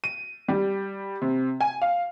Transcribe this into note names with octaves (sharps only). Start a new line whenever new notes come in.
D#7
G3
C3
G#5
F5